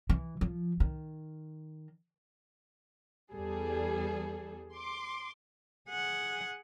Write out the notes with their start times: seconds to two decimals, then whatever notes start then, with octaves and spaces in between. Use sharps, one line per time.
0.09 E3
0.41 F3
0.80 D#3
3.33 E2 G3 G#4 A4
4.73 C6 D6
5.90 G#4 F#5